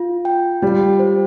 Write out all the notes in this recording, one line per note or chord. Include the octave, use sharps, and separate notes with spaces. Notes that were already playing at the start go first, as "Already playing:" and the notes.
Already playing: F4
G5
G3 F4
C5